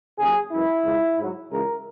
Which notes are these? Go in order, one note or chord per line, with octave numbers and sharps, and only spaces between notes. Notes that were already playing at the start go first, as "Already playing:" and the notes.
D#2 C#3 F#3 G#4
F#2 E3 G#3 E4
C#2 C#3 G#3
G#2 F#3
C#2 C#3 E3 G#3 A#4